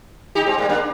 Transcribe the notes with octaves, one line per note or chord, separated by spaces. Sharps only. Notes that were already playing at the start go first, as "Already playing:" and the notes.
D#4 G4
G#3 C4
G3 A#3
A#3 D4